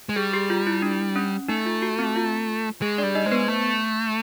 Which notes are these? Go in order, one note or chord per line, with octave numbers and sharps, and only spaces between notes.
G#3
G3 G#4
G4
F4
E4
D4
C#4
A3 D#4
F4
F#4
C4
F4
G#3 G#4
D4 D5
G3
D#4 D#5
G#3 C5
B3 B4
A3